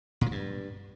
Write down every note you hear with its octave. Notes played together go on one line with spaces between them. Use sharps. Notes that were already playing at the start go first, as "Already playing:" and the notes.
A#2
F#3
G2